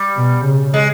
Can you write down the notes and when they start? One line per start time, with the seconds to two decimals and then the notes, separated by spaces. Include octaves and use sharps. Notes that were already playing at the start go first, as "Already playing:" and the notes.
Already playing: G3
0.16 B2
0.45 C#3
0.74 G#3